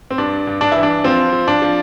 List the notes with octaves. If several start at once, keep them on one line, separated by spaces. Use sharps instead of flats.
C4
G2 D4
G2
D4
E3 E4
D4
F3 C4
F3
D4
F3